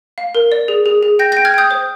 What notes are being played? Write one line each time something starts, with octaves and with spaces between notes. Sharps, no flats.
F5
A#4
D5
G#4
G#4
G#4
G5 G6 A#6
G6 A#6
G5
F6 G#6
G5 D#6 G6
C5